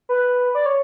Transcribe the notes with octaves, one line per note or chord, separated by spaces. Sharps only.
B4
D5
C#5